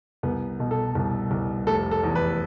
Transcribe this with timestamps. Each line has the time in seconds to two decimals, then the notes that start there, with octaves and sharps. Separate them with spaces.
0.23 C2 B3
0.60 B2
0.71 A4
0.95 C2
1.31 C2
1.67 F1 A4
1.91 A4
2.03 E2
2.15 B4